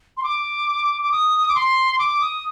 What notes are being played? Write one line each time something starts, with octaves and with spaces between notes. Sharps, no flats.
C6
D6
D6
D#6
D6
C6
D6
D#6